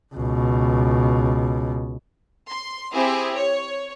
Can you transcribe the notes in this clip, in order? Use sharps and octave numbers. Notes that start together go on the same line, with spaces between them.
C#2 B2
C6
C4 E4 G4 G#4
C#5